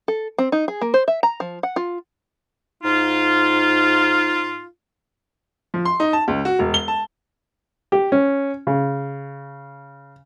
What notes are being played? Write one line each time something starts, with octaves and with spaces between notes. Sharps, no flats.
A4
C4
D#4
G#4
A#3
C5
E5
A#5
F3
F#5
F4
G#2 D#4 F4
F3
C6
D#4
A5
C#2
F#4
E1
G7
A5
G4
C#4
C#3